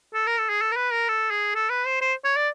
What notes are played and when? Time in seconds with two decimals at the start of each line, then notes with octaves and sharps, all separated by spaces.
0.14 A4
0.27 A#4
0.38 A4
0.49 G#4
0.61 A4
0.71 A#4
0.76 B4
0.92 A#4
1.08 A4
1.30 G#4
1.55 A4
1.69 B4
1.86 C5
2.01 C5
2.24 C#5
2.37 D5